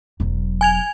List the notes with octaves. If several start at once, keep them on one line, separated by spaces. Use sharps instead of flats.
E1 F#3
G#5 G#6 F7